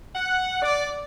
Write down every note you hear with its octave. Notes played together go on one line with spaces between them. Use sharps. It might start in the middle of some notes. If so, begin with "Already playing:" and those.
F#5
D5